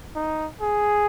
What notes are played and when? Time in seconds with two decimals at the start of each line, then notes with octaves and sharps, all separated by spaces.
0.15 D#4
0.61 G#4